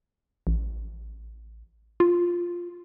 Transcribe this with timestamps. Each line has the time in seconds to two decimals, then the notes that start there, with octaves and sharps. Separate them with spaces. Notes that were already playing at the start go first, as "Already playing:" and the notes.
0.47 A1
2.00 F4